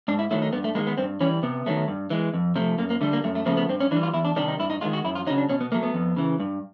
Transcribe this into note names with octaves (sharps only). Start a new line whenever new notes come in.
G#2 D4
E4
D#3 F#3 A3 E4
D#4
G2 B3
A3
D#3 G#3 A#3
B3
G2 C4
E3 G3 C#4
C3 B3
D#3 F#3 A3
G2
E3 G#3
F2
C3 F3 A3
F#2 A#3
A#3
D3 G3 A3
A#3
F#2 A3
A3
C#3 F3 A3 A#3
B3
G2 C4
C#4
E3 D4
G3
F4
E2 E4
D4
C3 D#3 G3 D4
D#4
G2 E4
D#4
D#3 G#3 F4
F#4
F#2 E4
F4
C#3 F#3 D#4
D4
B2 C#4
B3
F#3 A3 A#3
B3
F2
C#3 E3
G2